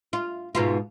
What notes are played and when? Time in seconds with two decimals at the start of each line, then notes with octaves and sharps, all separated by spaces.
0.13 F4
0.55 G#2 B2 F4